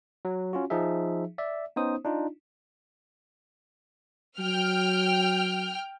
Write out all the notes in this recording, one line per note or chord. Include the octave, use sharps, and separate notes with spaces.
F#3
C#4 F4 F#4
F3 D#4 G#4 E5
D5 E5
B3 C#4 D#4 C5 D#6
D4 D#4 F4
F#3 G5 F6